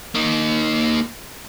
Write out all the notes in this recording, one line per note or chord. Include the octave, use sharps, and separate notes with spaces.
A#3 D#4